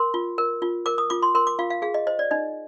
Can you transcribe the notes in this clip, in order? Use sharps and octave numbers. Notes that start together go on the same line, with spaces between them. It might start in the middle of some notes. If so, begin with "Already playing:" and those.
Already playing: A#4 C6
F4
A#4
F4
A#4 D6
D#6
F4 D6
C6
A#4 C6
D6
F4 F5
F5
G#4 F5
D#5
C5 D#5
D5
D#4 D#5